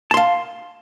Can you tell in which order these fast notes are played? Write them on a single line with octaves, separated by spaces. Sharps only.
A5 C6 F5